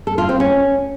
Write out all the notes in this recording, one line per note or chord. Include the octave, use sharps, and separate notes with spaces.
A4
F4
C4
C#4